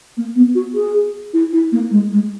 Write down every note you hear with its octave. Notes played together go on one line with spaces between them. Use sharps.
A#3
B3
F#4
G#4
E4
E4
A#3
G#3
G#3